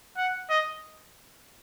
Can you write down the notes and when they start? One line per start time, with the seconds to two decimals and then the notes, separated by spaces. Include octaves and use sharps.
0.17 F#5
0.50 D#5